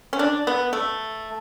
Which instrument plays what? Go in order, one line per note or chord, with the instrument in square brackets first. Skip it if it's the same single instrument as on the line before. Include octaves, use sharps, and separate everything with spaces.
[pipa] C#4
D4
B3
A3